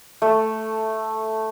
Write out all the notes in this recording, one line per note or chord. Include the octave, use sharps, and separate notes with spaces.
A3